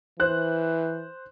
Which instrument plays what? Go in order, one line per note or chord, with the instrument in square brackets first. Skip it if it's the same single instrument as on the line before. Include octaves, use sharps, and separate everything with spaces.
[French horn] E3 [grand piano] C5 F#6